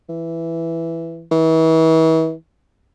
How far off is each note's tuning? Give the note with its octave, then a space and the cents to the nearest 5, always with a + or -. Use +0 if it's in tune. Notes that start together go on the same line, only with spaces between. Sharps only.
E3 +5
E3 -40